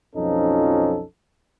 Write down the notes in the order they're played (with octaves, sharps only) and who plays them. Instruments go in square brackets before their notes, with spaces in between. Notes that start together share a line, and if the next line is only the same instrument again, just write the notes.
[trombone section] B1 F2 F3 C#4 D#4 A4